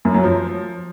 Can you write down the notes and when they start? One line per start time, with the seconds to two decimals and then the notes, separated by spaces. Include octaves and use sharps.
0.05 F#2
0.14 F#3
0.24 F3